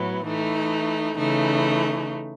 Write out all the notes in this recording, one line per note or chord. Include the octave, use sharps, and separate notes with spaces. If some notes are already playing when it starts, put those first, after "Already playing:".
Already playing: A2 F#3 B3 E4
E3 A3 D#4
C#3 E3 A3 D#4